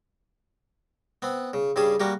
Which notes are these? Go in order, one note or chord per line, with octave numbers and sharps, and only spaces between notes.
B3 C4
C#3
G2 C#3 G3 G#4 A5
G3 A#3 F#4 G4